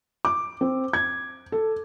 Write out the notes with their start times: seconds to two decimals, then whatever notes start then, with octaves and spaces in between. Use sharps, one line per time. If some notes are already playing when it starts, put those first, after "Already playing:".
0.25 D6
0.61 C4
0.93 G#6
1.52 A4